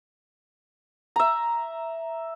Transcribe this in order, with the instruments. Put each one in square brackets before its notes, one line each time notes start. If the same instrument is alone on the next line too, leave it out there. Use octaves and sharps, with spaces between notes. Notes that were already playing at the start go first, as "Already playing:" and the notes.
[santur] E5 A#5